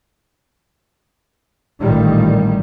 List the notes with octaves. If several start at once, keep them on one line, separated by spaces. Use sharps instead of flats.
A1 A#2 D#3 G3